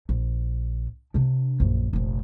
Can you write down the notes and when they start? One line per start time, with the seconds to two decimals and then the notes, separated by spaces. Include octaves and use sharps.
0.09 A#1
1.14 C3 D4
1.60 A#1 F#2
1.93 F1 A#1